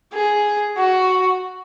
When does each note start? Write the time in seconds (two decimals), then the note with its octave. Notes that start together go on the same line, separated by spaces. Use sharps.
0.13 G#4
0.77 F#4